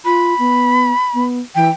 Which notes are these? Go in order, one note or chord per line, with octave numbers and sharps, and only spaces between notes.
F4 B5
B3
B3
E3 G5